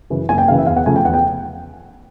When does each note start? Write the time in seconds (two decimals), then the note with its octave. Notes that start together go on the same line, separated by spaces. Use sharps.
0.10 F#2 C#3 E3
0.29 F#1 G#5
0.38 G5
0.47 F#2 C#3 E3 F5
0.58 E5
0.67 E2 F5
0.76 F#5
0.86 C#3 F3 A3 G#5
0.96 G5
1.05 E2 F#5
1.14 G5